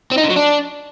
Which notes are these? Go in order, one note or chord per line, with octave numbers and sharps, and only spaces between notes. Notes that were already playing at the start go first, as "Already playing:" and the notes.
C4
D#4
D3
F#3
D4